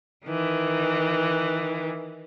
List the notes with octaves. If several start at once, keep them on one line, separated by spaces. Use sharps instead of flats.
D#3 E3